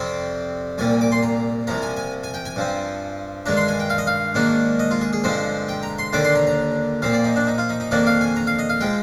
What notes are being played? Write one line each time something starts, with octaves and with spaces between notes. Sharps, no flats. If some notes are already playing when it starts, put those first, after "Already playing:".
Already playing: F2 C3 G3 C4
C2 A#2 G3 G#5
D6
C6
A#5
C2 C3 F3 A#5
G#5
G#5
G#5
G5
G#5
G2 F3 C4
G2 D#3 G#3 D4 A#5
C6
G#5
G5
F5
D#5
F5
G#2 D#3 A#3 D4
D#5
F4
G#4
G#4
G2 D3 F3 G#3 C4 C5
G5
A#5
C6
D#2 D3 G3 D4 D6
C6
A#5
A#5
A#2 F3 C4 F5
D5
D#4
D4
D#4
F4
D#4
D#4
F2 D#3 A#3 D4 D5
F5
G#5
A#5
F5
D#5
F5
F3 G#3 G5